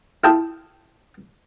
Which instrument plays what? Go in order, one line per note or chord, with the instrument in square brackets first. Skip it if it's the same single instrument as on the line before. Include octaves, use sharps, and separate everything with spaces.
[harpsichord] E4 F4 A4 G5 A5 D#6